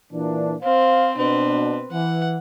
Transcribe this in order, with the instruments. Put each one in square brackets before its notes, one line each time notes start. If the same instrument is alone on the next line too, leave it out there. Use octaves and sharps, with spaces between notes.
[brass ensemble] A#2 E3 D4
[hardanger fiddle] C4 [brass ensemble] C5 F5
[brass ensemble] B2 D4 [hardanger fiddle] C4 B4
[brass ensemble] E3 [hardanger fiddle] F#5